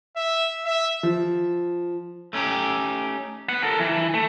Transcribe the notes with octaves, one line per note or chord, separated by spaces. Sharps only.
E5
E5
F3
A3 C#4 D#4 G4
B3 F#5
A4 A#4
E3
A3